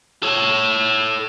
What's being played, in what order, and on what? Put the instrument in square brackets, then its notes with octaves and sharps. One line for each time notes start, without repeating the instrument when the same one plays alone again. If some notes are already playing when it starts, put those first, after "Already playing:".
[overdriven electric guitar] A4 C#5